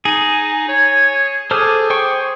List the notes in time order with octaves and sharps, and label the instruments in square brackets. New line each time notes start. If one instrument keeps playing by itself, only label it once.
[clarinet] D#4 [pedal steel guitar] G#4
[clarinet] C#5 [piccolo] G#6
[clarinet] G#4 [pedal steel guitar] A4 C5 F6 [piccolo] D6
[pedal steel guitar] C5 G5 C#6